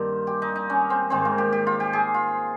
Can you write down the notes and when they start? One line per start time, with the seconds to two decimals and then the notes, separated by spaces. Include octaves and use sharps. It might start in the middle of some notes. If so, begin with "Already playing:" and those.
Already playing: G2 D#3 A#3 C4
0.27 G4
0.42 D#4
0.56 D#4
0.70 C#4
0.90 C4
1.10 G#2 D#3 C4
1.25 A#3
1.38 G4
1.52 G4
1.67 F4
1.80 G4
1.93 G#4
2.14 F4